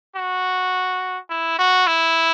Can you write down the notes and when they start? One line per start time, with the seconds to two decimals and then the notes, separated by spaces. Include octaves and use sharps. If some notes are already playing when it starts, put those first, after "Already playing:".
0.16 F#4
1.29 E4
1.59 F#4
1.87 E4